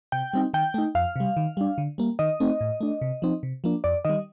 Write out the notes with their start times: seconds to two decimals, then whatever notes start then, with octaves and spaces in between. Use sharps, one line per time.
0.12 C3 G5
0.33 G3 C4 D#4
0.54 D#3 G5
0.74 A3 D#4
0.95 F2 F5
1.16 C3 G3
1.37 D#3
1.57 G3 D4
1.78 D3
1.98 G3 A#3
2.19 D#3 D#5
2.40 A3 C4 D#4
2.61 A2
2.81 A3 D4
3.02 C3
3.22 F3 C4 D#4
3.43 C3
3.64 F3 A#3 D4
3.84 F2 D5
4.05 D#3 G3 D#5